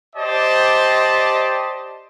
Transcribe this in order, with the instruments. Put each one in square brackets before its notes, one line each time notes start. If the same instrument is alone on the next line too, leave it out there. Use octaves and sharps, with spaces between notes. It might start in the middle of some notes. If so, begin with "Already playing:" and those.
[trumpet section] G4 C5 D5 D#5 A5